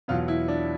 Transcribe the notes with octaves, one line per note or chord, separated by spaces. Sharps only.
E2 B2 F#3 B3 F4
E4
D4